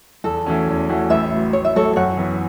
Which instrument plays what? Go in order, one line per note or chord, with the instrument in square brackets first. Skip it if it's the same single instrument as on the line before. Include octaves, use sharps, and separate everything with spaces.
[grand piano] E2 [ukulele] A4
[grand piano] E3 A3 C#4 F#4
E2
E3 A3 C#4 F#4
[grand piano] A1 [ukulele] B4 E5
[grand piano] A2 F#3
[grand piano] A1 [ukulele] C#5
[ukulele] E5
[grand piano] A2 F#3 [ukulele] A4 C#5
[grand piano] F#2 [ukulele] C#5 F#5
[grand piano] E3 B3